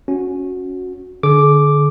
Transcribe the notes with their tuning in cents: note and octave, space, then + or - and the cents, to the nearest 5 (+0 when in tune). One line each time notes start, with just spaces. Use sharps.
C#4 +0 F#4 -15
D3 +0 G#4 +40 D6 +0